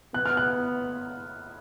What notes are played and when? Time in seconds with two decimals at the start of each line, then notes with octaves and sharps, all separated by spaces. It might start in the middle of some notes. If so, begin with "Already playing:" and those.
0.14 B3 F#6
0.26 F6
0.37 F#6